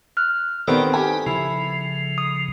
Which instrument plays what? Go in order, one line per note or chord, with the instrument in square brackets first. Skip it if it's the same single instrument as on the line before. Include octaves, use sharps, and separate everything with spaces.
[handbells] F6 F#6
[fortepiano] D#3 B3 C4 [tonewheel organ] G4 A#4 D5 [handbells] A4
[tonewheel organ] D#4 B4 [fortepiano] G4 G#5
[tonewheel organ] C#3 F3 [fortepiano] E4
[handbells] D#6